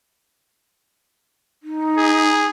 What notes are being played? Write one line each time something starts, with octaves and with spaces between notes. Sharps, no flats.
D#4
G#4